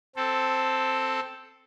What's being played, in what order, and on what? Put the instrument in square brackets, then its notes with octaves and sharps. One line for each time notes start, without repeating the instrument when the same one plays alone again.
[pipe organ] C4 A4